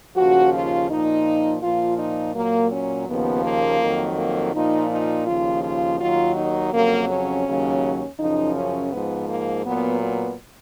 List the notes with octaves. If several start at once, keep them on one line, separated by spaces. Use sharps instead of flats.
D#2 C#3 F3 F#4
F4
A#2 F3 D#4
A#2 F3 F4
D#4
A#2 F#3 A#3
C#4
D#2 C#3 F3 B3
A#3
F2 D#3 F#3
A#3
A#2 F3 D#4
D#4
D#2 C#3 F3 F4
F4
D#2 D#3 F#3 F4
D#4
F2 C#3 F#3 A#3
C#4
D#2 C#3 F#3
F#2 C#3 F3 D#4
C#4
G#2 F3 B3
A#3
A#2 F#3 B3
B3